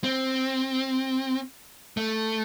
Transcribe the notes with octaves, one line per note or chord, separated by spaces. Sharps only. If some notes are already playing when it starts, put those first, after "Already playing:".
C4
A3